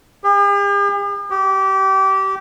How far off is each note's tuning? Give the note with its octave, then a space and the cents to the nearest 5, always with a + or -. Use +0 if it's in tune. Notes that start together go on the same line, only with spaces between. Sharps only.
G4 +45
G4 -25